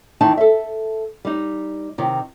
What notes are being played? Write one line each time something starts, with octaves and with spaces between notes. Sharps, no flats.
E2 D#3 D#4 E4 A5
A4 E5
G3 D#4
C3 D#3